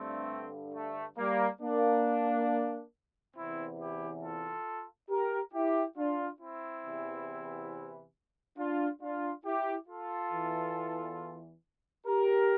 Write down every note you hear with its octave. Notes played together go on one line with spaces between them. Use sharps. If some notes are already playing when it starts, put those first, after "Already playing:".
Already playing: G2 D3 A3 C4
A3
G3 A#3
A#3 D4
E2 C3 E3 C4 E4
E4 G4
F4 A4
G4 A#4
E4 G4
D4 F4
C4 E4
E2 C3 E3
D4 F4
D4 F4
E4 G4
F4 A4
E2 E3
G4 A#4